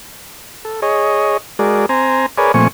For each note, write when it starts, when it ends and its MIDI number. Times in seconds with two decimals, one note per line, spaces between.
0.65 0.81 69
0.82 1.37 68
0.82 1.37 73
0.82 1.37 75
1.59 1.86 56
1.59 1.86 66
1.59 1.86 68
1.59 1.86 70
1.59 1.86 74
1.89 2.26 60
1.89 2.26 72
1.89 2.26 80
1.89 2.26 82
2.38 2.52 68
2.38 2.52 70
2.38 2.52 71
2.38 2.52 73
2.38 2.52 74
2.38 2.52 80
2.54 2.68 46
2.54 2.68 53
2.54 2.68 57
2.54 2.68 60
2.54 2.68 80
2.54 2.68 85